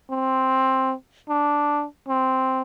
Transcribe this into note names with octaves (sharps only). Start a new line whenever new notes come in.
C4
D4
C4